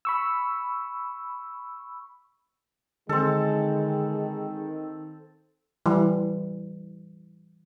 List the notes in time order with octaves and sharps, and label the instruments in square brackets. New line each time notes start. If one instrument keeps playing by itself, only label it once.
[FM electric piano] B5 C#6 E6
[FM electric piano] D3 [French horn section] D#3 [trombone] G#3 [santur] C4 A4
[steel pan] E3 G3